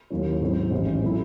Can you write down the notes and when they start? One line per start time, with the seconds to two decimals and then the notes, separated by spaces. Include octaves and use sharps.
0.10 D#2 D#3 F#3 C#4 E4
0.41 G#2 F#3 C4 E4
0.71 A1 G#2 E3
1.02 A2 F#3 A3 C4 E4